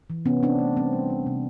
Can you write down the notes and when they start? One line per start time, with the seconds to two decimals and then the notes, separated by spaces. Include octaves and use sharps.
0.10 E3
0.26 C3 B3 C#4
0.42 C3 C4 D4
0.59 A3
0.77 G3 C4
0.93 G3
1.10 G3
1.26 C3